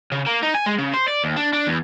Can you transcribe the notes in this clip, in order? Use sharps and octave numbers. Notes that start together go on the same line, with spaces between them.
C#3
A#3
D#4
G#5
G#3
C#3
C5
D5
D#2
D4
D4
E2